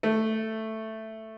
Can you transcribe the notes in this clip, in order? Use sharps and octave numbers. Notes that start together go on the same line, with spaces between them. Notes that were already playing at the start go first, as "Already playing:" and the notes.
A3